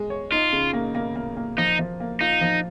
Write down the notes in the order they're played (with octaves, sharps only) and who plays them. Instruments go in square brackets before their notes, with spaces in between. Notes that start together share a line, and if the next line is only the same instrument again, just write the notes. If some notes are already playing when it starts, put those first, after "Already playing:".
Already playing: [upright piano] G#3
C#5
[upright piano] D#4 [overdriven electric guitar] F4
[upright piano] C#3
A#3
A#3
A#3
A#3
[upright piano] F3 [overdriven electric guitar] D#4
[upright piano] F3
A#3
[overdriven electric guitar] D#4 [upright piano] F4
[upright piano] F3